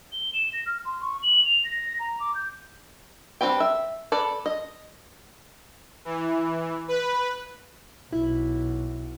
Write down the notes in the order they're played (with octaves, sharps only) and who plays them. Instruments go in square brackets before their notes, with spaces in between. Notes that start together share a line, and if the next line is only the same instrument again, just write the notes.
[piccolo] G7
E7
A#6
F6
C6
C#6
F#7
F7
A#6
A#5
D6
G6
[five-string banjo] G3 C4 D4 B4 G5
E5
A4 B4 D5
D#5
[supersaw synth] E3
B4
[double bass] B1 [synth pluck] E4